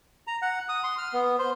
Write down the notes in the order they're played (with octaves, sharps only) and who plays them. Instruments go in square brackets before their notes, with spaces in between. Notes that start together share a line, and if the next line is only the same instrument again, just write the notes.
[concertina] A#5
F#5
D#6
C6
F6
B3
C5